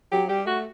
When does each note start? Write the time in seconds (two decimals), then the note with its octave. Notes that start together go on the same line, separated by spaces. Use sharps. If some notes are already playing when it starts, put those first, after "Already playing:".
0.12 F#3 G4
0.29 G3 G4
0.47 A3 F#4